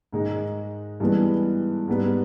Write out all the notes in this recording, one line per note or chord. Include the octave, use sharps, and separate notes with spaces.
G#2 D#3 G#3 D#4
G2 E3 G#3 B3
G#2 G3 B3